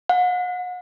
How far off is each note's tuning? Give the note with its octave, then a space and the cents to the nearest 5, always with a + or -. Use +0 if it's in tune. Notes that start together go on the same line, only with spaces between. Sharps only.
F#5 -40